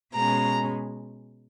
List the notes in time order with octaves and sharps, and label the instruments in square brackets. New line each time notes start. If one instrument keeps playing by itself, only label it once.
[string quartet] B2 G#3 C#4 A#5